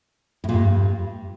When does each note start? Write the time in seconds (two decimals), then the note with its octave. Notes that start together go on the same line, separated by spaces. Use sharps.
0.44 A2
0.49 A#2
0.54 G2